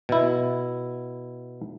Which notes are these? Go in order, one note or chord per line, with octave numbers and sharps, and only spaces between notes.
B2 E4